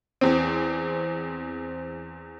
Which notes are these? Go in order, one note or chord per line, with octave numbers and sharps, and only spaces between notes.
E2 C4